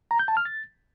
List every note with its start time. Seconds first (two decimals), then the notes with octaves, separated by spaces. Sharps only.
0.11 A#5
0.19 G6
0.28 A5
0.37 F6
0.45 A6